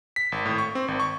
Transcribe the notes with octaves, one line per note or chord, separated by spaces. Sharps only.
B6
G#1
A2
C#6
C4
G#1
C#6